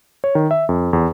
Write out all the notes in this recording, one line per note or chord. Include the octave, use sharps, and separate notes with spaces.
C#5
D#3
E5
F2
E2